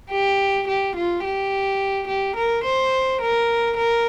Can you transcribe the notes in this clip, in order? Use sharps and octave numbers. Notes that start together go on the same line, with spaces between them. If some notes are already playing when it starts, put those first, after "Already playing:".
G4
G4
F4
G4
G4
A#4
C5
A#4
A#4